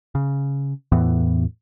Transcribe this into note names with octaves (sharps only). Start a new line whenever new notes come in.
C#3
E2 A2 E3 B3